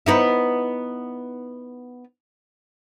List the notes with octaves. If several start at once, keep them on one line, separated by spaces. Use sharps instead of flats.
B3 D#4 E4